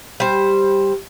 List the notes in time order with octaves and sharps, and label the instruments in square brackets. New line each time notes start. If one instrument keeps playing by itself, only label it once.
[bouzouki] G3 C5